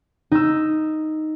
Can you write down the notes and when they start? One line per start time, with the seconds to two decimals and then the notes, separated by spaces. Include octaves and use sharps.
0.31 D#4 E6